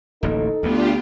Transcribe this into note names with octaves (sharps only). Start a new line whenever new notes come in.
D1 A1 A#3 D#4 A4
D2 A3 B3 D4 F4 G4